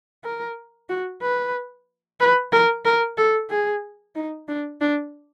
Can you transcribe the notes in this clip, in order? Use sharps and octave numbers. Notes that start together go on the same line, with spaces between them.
A#4
F#4
B4
B4
A#4
A#4
A4
G#4
D#4
D4
D4